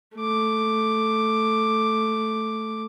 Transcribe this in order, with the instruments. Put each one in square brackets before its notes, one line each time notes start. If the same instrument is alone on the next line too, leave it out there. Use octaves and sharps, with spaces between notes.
[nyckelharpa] A3 D6